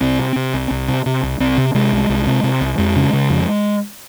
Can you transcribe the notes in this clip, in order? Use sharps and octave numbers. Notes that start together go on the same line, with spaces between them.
C2 C4
C3
C3
C2
C2
C3
C3
C2
C2 C4
C3
C3 G#3
C2
C2
C3
C3
C2
F2 G#3
C#3
C#3
F2